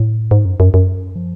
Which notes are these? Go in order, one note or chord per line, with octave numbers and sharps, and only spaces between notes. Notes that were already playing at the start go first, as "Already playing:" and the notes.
Already playing: A2
G#2
F#2
F#2
F#2
F3